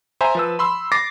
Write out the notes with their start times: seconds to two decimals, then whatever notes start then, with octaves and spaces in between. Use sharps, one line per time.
0.21 C5 E5 G#5 A#5
0.35 F3 B4 E6
0.59 B5 C6 E6
0.92 D6 A6 A#6 C7